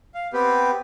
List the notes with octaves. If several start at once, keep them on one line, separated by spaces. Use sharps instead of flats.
F5
B3 C4 G4 B4